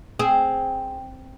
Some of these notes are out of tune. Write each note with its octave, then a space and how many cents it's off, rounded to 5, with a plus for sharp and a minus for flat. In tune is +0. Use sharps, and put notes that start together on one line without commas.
C4 +0 G#4 +0